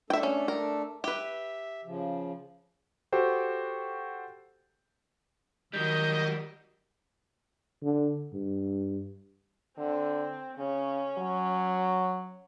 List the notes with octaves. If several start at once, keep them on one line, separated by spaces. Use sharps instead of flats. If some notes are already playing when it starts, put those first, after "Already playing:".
A3 D4 A4 E5 G5
C#4
A#4
G4 B4 E5
C#3 F3
F#4 G4 A4 C5 G5
D#3 F#3 G3 D#5 G6
D3
G2
D3 C4
C#3 C#4
F#3